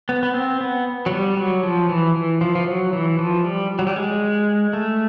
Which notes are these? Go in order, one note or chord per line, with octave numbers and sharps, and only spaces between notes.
B3
B3
C4
B3
F#3
G3
F#3
F3
E3
E3
F3
F3
F#3
E3
F3
G3
F#3
G3
G#3
A3